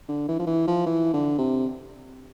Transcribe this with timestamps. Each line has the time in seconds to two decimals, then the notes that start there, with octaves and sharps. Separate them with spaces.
0.08 D3
0.28 E3
0.39 F3
0.47 E3
0.67 F3
0.86 E3
1.13 D3
1.39 C3